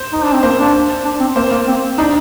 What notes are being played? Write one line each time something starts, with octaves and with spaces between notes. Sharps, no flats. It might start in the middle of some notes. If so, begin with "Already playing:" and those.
Already playing: C5
D#4
D4
C4
A#3 C5
D4
D4
C4
A#3 C5
A#3
C4
D4 D#4